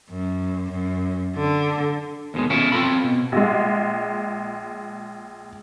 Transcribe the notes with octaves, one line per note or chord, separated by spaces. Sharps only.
F#2
F#2
D3
D#2 B2 G#3
B2 C#4 E4 F4 A4
C4 F4 A4 B5
B2
A#1 G#3